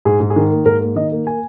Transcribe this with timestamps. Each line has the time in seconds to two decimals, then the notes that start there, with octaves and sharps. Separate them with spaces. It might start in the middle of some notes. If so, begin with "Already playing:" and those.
0.05 G#2 G#4
0.20 G#2
0.30 G#4
0.36 D#3
0.51 A#3
0.65 G#2 A#4
0.81 A#3
0.95 D#3 D#5
1.12 A#3
1.27 G#5